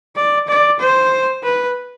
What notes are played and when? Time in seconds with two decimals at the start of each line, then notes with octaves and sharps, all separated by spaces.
0.16 D5
0.48 D5
0.80 C5
1.43 B4